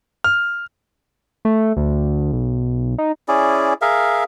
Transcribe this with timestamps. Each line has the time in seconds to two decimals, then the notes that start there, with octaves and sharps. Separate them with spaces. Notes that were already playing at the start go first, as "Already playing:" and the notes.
0.24 F6
1.45 A3
1.77 D2
2.33 B1
2.98 D#4
3.28 C#4 E4 G#4 D5
3.82 G#4 A#4 E5 F5